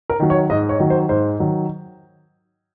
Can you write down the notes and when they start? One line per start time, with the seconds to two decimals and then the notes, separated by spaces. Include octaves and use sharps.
0.10 A#4
0.20 D#3 F#3
0.30 C#5
0.50 G#2 D#5
0.69 C#5
0.79 D#3 F#3
0.90 C5
1.09 G#2 C5
1.40 D#3 F#3